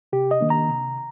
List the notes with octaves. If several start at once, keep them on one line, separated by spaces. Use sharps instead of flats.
C3 G4
D#5
D#3 A#3 D4
A#5
C3